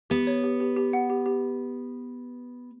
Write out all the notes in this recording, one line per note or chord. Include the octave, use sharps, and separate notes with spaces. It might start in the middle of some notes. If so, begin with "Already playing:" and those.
B3 G4
C#5
G4
G4
G4
F#5
G4
G4